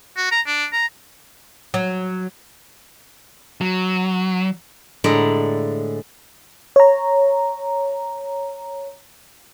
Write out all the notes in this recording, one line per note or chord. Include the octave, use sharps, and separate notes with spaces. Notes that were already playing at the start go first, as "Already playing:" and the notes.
F#4
A#5
D4
A#5
F#3
F#3
A2 D3 G#3 D5 A#5
C#5 A#5